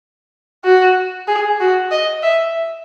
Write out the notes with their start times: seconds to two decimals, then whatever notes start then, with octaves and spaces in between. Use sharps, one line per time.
0.65 F#4
1.28 G#4
1.60 F#4
1.91 D#5
2.23 E5